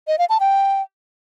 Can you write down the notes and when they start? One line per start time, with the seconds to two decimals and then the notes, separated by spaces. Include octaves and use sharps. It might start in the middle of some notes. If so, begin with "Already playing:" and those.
0.08 D#5
0.18 F5
0.29 A5
0.40 G5